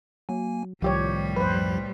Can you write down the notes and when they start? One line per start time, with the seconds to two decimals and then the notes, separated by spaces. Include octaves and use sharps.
0.29 F#3 A#3 G#5
0.82 C2 A2 D#3 F3 G3 G4 C#5
1.36 F#2 F3 B4 C5